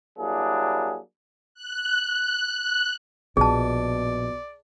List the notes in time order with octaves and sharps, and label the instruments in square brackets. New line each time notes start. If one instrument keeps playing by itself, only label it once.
[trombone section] F#3 G3 A#3 D4 E4 G#4
[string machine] F#6
[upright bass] A#1 [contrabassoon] B2 [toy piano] G#4 A5 [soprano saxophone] D5